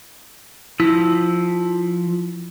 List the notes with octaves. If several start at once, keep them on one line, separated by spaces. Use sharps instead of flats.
F3 E4 E6